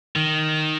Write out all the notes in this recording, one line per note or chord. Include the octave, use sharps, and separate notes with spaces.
D#3